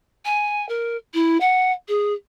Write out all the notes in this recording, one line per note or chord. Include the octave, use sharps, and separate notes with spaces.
G#5
A#4
E4
F#5
G#4